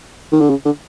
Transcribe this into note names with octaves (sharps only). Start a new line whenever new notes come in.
D#3
D3
C#3
D3